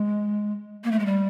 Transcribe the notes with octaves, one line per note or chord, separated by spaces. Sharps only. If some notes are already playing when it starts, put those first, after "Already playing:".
Already playing: G#3
A#3
A3
G#3
G3